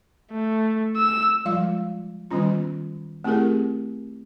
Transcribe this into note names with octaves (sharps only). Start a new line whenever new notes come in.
A3
E6
F3 G3 G#3 F4 F5
D#3 G3 B3 C#4 F4
A3 C4 E4 G4 G#4 A#4